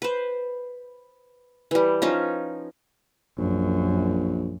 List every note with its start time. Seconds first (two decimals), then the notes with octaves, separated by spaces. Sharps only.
0.02 B4 C5
1.71 E3 G3
2.02 F3 C#4 D#4
3.38 A#1 F#2